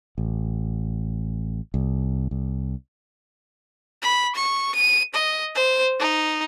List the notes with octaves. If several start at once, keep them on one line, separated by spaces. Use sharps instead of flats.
A1
C2
C2
B5
C#6
D#7
D#5
C5
D#4